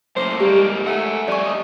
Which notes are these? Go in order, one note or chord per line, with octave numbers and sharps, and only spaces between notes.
F#2 A2 A#3 C5
G#2 G3 A#3 G4
A3 F#5 G#5
F2 G3 A3 D5 G#5 C#6
D#5